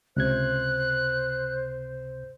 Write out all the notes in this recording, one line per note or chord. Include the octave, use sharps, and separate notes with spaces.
C#2 C3 C5 F#6 G#6